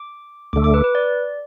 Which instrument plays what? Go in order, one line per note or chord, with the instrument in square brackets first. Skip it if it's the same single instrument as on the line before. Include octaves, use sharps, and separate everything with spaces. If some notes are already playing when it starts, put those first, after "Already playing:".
Already playing: [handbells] D6
[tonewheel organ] D2 D3 A3 [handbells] D6
[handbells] D6
B4
B4
D5